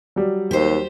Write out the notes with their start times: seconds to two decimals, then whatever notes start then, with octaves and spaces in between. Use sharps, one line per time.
0.16 F#3 G3
0.51 D#2 G4 C5